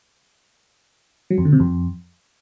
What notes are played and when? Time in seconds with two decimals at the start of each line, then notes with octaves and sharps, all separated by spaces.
1.30 F#3
1.38 F2
1.45 D3
1.52 C3
1.60 F2